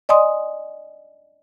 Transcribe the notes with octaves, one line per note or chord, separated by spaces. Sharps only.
D5 D#5 G#5 C6 D#6